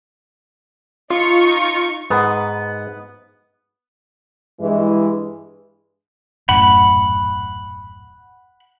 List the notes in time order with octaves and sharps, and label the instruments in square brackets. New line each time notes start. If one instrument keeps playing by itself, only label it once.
[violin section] D#4 C#6 [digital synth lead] F4
[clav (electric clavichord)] G#2 [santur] B3
[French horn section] G2 E3 G#3
[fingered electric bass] D#1 F#2 A2 [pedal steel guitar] F#5 B5